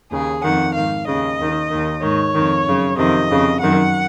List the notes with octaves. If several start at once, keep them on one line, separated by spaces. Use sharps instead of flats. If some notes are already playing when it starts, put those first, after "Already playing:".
D#2 C#3 G#4
F2 D#3 F#5
G#2 D#3 F5
D#2 C#3 D#5
D#2 D#3
D#2 D#3
G#2 D#3 C#5
F2 D#3
F#2 C#3
F2 C3 D#3 D#5
F2 C#3
F#2 D#3 F#5